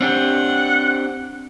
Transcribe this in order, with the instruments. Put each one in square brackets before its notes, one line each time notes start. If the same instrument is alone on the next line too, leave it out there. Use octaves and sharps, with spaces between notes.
[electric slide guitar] C4 D4 G4 [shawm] F#5